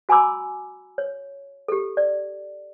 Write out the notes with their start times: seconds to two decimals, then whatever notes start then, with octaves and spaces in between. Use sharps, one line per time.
0.09 F#4 G#5 A#5 B5 D6 E6
0.98 C#5
1.68 G4 A4
1.97 D5